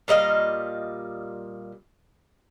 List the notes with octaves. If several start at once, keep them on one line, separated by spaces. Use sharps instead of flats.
A#2 G3 D#5 F5